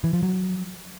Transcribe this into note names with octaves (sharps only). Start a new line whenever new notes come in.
E3
F3
F#3